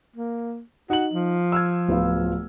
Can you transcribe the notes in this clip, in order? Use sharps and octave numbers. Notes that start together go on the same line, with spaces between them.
A#3
D#4 F#4 F#7
F3
E6 F6 G#6
D1 B3 F4